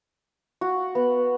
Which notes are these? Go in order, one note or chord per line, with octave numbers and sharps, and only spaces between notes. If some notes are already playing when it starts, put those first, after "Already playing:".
F#4
B3